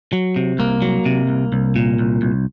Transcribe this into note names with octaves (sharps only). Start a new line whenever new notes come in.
F#3
C3
C2 A#3
F#3
C3
C2
C2
A#2
C2
C2